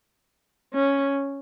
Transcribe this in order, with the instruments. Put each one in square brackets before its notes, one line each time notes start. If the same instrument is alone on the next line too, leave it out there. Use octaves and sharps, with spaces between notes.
[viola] C#4